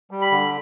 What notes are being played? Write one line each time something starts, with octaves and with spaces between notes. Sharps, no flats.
G3
B5
D3